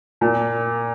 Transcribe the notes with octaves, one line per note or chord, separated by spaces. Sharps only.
A#2